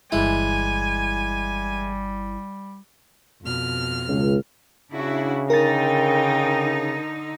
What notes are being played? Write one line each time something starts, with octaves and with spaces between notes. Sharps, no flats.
G1 E3 G3 G#3 E4 A4 G#5
F2 B2 F6
C#2
C#3 D4 E4 F#4
D3 D#4 A#4 G5 A6